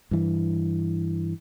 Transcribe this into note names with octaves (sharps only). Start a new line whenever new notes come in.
G2 E3